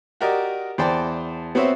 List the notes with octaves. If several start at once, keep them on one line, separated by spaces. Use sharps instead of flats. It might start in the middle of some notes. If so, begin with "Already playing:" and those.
F#4 G4 A#4 D5 D#5
E2 C5 D5 G5 A5
B3 C4 F#4 C5 C#5 E5